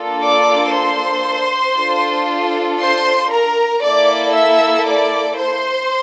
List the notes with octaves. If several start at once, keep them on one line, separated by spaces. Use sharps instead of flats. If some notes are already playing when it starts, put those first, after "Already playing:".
Already playing: A#3 D4 F4 A4
D5 D6
C5 C6
D4 F4 A4
C5 C6
A#4 A#5
A#3 E4 A4 D5 D6
E5 E6
D5 D6
C5 C6